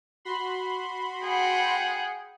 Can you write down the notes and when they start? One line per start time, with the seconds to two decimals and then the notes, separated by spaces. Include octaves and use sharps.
0.25 F#4 B5 C6
1.24 G#4 F#5 G5